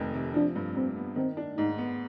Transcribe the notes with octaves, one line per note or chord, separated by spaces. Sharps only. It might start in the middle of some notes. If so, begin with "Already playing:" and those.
Already playing: F1 F2 D#3
C3
F3 D4
G2
G2 C4
B3
D#3 C4
D4
G#2 D#4
B3